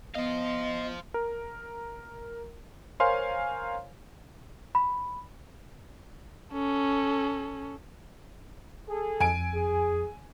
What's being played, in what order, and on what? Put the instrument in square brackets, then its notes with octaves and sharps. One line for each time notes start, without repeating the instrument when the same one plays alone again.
[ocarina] B3 [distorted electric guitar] C5 F5 [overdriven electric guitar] D#5
[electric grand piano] A#4
A#4 C5 C#5 F5 G#5 C6
[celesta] B5
[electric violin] C#4 A4
[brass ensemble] G#4 A4
[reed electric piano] F2 [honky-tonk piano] G#5 D7
[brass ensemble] G#4